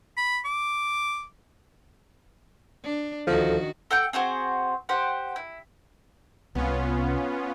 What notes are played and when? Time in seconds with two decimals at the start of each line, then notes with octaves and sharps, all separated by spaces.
0.17 B5
0.45 D6
2.83 D4
3.27 D2 D#3 F3 F#4 A4
3.91 A4 F#5 G5 G6
4.13 C4 F#4 G#4 C5
4.89 G4 C5 F#5
5.36 E4
6.55 C2 C3 B3 C#4 F4